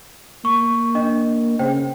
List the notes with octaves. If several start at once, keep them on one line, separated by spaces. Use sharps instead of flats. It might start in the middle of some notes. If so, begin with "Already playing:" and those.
A#3 C#6
D4 D#5
C#3 C5 G5